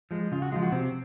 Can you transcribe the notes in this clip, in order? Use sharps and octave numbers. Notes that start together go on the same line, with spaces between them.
F3 G#3
C#3 F4
F#4
F3 G#3 F4
F#4
C3 C4